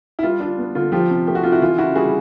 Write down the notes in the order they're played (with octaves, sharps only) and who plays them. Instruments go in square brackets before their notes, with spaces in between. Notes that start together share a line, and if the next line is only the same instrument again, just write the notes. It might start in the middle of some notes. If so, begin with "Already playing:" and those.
[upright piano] E4
G3 F4
D4 F4
B3
D3 F4
F3 F4 G4
C3
A3 G4
F#4
C3 F4
E4 F#4
E3 F4
C#3 E4 F#4
G3 F#4 G#4